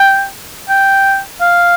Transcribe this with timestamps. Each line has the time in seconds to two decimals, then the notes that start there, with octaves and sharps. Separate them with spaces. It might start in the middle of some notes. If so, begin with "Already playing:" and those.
Already playing: G5
0.69 G5
1.41 F5